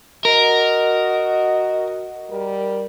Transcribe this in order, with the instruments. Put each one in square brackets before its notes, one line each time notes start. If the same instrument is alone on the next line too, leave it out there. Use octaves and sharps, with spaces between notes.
[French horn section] F#4 D#5 [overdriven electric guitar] A#4
[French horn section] G3 A#4